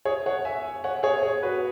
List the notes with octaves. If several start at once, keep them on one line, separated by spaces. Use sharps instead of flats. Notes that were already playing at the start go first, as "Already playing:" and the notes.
G#4 C#5
C#5 F#5
E5 G#5
C#5 F#5
G#4 C#5
G#4 C#5
F#4 B4